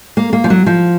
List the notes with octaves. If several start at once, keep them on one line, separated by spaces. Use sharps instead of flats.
A#3
A#3
F3
F#3
F3